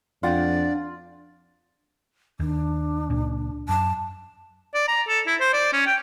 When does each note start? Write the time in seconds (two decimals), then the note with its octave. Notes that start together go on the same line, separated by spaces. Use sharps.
0.23 F2 D4 F4 D5 F#5 G5
2.40 D#2 D4
3.10 C#2 A#2
3.69 F#2 A5
4.74 D5
4.88 A#5
5.08 A4
5.27 E4
5.40 C5
5.53 D5
5.73 C#4
5.87 G5